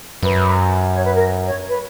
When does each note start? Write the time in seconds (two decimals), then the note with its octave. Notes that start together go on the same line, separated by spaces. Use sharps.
0.23 F#2 B4
0.94 C#5
1.05 B4
1.15 A#4
1.46 C#5
1.69 B4